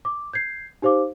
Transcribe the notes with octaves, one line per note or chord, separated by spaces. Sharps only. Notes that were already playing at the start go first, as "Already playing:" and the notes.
D6
G6 G#6 C7
D#4 G4 C5 F5 D6